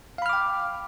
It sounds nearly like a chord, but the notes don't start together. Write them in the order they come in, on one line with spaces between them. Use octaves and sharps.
F5 B5 F6 D6 G5